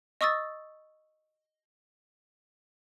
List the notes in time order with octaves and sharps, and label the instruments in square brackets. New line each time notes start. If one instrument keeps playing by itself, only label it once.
[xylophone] D#5 C#6 D#6 E6 A6